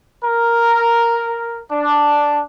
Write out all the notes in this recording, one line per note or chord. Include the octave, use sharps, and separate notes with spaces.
A#4
D4